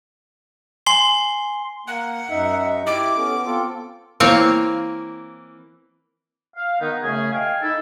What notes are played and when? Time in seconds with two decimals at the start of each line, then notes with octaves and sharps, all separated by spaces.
0.86 G#5 C6 C7 G7
1.87 A#3 F#5
2.30 F#2 D#4 D#5 E5
2.86 E4 G4 D6
3.17 B3 C#4 A4
3.45 B3 C4 F4 A4
4.20 E3 A#3 C4 C#5 F5
6.56 F5
6.80 D#3 B3 D#4
7.03 F#2 C#3 A3 C#4 G#4
7.32 D#5 F5 G5 G#5
7.62 D#4 E4 A4